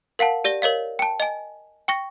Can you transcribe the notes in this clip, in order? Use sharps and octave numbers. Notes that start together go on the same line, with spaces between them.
A#4 F5 F#5 A5
G4 D5 A#6 G7
A#4 C#5 D#5 F5
G5 A5
D#5 G#5
G5 C#6 A#6